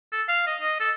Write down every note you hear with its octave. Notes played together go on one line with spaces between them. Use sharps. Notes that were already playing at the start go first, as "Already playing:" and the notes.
A4
F5
D#5
D#5
A4